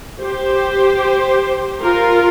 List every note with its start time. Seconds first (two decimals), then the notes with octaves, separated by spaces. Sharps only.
0.21 G4 C5
1.82 F4 A#4